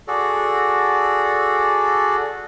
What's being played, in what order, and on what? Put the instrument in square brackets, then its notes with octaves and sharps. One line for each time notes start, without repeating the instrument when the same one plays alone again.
[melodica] F#4 G#4 A4 D5